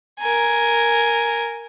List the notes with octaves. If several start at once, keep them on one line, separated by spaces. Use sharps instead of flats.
A#4 G#5